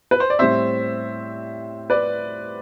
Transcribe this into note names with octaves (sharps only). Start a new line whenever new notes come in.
B4
C5
D5
A2 G3 C4 C5 E5
B4 D5